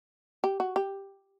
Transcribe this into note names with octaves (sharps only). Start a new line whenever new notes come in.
G4
F#4
G4